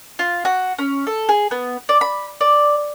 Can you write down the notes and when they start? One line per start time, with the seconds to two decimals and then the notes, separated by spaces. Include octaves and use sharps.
0.19 F4
0.45 F#4
0.79 C#4
1.07 A4
1.29 G#4
1.51 B3
1.89 D5
2.01 B5
2.41 D5